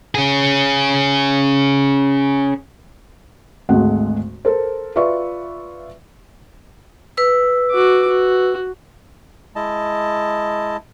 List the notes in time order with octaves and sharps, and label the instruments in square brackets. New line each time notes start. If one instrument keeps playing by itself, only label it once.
[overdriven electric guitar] C#4 G#4
[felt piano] G#1 D2 G#3 A3 F#5
A4 A#4 C5
F4 B4 D5 E5 C#6
[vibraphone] B4 E6
[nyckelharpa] F#4 D6
F#4
[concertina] G#3 E4 D#5 A5